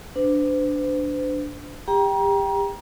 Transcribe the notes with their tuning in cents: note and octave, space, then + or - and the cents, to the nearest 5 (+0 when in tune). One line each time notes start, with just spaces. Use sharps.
D4 +0 C5 -45
G4 +30 G5 -5 A#5 +30